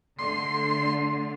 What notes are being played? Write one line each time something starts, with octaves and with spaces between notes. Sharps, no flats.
D3 A3 C6